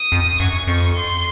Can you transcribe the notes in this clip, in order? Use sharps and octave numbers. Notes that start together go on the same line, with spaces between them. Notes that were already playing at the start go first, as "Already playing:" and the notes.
Already playing: D#6
F2
F#2 C#6
F2
C6